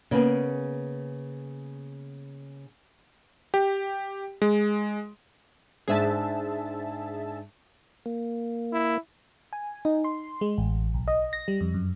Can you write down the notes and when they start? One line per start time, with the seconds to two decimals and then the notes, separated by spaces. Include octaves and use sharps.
0.11 C#3 A#3 B3 G#4
3.54 G4
4.42 G#3
5.88 G#2 D4 G#4 C5 E5 A5
8.06 A#3
8.73 E4
9.53 G#5
9.85 D#4
10.04 C6
10.41 G#3
10.58 A1
10.94 B1
11.08 D#5
11.33 A#6
11.48 G3
11.61 F2
11.74 F#2